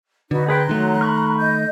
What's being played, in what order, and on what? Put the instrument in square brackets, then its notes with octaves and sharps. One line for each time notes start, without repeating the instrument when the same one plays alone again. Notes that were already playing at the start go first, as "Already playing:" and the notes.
[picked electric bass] D3 [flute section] D#4 F#4 B4
[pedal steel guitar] G#4 B4 G5 [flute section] A#5 C6 F#6
[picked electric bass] D#3 A3 [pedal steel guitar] F#3
[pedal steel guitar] B5 C#6 F6
[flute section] D#5 G6